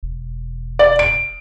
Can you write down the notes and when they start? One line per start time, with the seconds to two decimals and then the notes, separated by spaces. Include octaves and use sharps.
0.03 E1
0.79 D5
0.99 D7